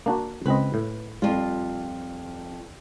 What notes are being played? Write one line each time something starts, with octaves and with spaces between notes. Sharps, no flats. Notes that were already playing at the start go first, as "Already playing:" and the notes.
A#3 D4 F#4
C#2 C4 B4 D#5
A2
F2 G3 F4